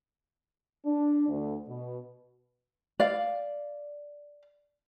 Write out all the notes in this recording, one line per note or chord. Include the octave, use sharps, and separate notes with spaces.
D4
D2
B2
D5 F5